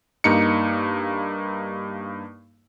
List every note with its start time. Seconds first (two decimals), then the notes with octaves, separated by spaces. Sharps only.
0.24 G2 A#3 D#4 C#7